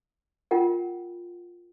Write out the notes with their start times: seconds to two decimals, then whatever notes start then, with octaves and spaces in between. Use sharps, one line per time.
0.51 F4 A#4 F#5 G5